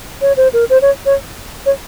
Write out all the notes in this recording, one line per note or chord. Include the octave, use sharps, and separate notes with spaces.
C#5
C5
A#4
C5
C#5
C#5
C#5